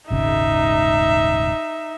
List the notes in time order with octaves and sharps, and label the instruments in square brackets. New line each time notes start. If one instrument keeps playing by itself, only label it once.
[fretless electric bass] D#1 G#1 C#3 [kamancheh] D#4 E5